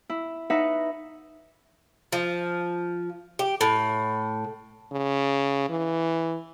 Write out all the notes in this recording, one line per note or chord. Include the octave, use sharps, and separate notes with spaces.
E4
D#4 B4 E5 F#5
F3
G4
A2
C#3
E3